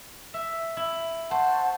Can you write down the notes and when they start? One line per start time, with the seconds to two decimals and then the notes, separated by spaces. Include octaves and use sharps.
0.34 E5
0.77 E4
1.31 C5 F#5 A5 C#6